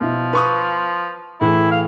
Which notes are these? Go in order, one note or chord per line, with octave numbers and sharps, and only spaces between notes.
B2 F3 E4
B4 C#6 D#6
A2 E3 E4 G#4
F5